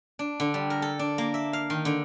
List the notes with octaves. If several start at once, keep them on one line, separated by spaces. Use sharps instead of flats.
D4
D3
G3
A#4
A4
D4
A#3
E5
F5
D#3
D3